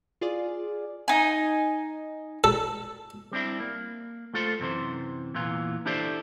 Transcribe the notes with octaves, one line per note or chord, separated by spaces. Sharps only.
F4 G#4 D5
D#4 G#5
A4
G3 C4 D4 E4
A#3
A3 F4 A4 C5
F#2 C3 E3 C5
E2 A#2 E3 F4
D4 E4 G4 A4 C5 D5